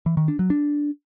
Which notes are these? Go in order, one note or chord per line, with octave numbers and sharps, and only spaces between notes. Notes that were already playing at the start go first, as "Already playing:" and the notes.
E3
D#3
D4
F#3
D4